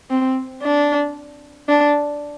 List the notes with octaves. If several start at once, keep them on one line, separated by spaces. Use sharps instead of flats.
C4
D4
D4